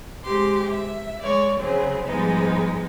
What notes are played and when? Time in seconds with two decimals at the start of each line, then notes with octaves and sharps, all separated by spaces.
0.23 G#3 C4 G4 C6 D6
0.70 E5
1.21 G#3 C#5 D5
1.60 C#3 F#3 C4 G#4
2.05 G#2 F3 G3 G#3 B3 D#4